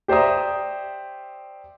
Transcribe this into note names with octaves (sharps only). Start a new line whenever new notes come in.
G4 C5 D5 E5 A#5 D#6